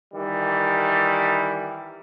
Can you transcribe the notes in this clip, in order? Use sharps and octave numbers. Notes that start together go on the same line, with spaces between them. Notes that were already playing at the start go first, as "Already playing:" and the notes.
D#3 E3 G3